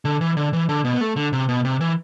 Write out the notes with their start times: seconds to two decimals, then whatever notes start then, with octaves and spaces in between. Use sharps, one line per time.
0.05 D3
0.21 E3
0.37 D3
0.53 E3
0.69 D3
0.85 B2
0.93 B3
1.01 A3
1.16 D3
1.33 C3
1.49 B2
1.65 C3
1.81 E3